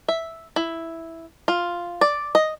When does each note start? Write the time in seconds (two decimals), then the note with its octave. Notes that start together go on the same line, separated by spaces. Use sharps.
0.08 E5
0.56 E4
1.48 F4
2.01 D5
2.35 D#5